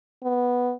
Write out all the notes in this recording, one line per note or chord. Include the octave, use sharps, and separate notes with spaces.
B3